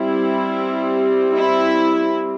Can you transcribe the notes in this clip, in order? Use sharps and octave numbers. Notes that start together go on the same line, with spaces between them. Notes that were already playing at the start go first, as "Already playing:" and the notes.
Already playing: G3 C4 E4
E4